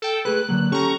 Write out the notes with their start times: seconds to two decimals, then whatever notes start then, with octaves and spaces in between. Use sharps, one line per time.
0.02 A4 G5
0.25 A3 G#4 B4 F#6
0.49 D3 F#3 A#3
0.72 C#4 G4 A4 A#5 C#6